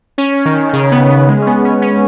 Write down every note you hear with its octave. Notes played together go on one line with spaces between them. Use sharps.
C#4
D#3
D#3
C#3
B3
B3
G#3
C#4
B3
C#4
C#4